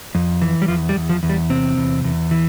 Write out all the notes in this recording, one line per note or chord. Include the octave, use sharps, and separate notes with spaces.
F2
E3
G3
E2 F3
G3
E2
F3
E2
G3
C3 C4
E2
E2
E3